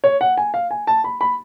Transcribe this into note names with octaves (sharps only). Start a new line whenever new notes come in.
C#5
F#5
G#5
F5
G#5
A5
B5
B5